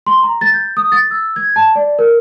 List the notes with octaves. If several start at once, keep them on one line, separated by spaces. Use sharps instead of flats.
C6
A#5
A6
G6
D#6
A6
E6
G#6
A5
D5
A#4